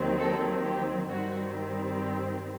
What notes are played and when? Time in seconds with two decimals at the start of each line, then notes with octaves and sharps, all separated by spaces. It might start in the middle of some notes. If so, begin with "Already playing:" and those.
Already playing: D#2 D#3 F#3 C4
0.19 A4
0.64 G4
1.09 G2 D#3 G3 C4 F#4
1.97 G4